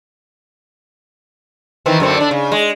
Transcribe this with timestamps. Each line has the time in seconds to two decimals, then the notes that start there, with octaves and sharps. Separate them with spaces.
1.86 D#3 E3 C4
2.00 F#2 D3 C4
2.18 D3 D4
2.31 C#3
2.52 G#3